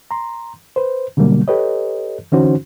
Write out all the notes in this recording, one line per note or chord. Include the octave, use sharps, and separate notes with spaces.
A#5 C6
B4 C5
B2 D3 F#3 G3 A#3
G4 A4 B4 C#5 D#5
D3 E3 C#4 D#4 F#4 C5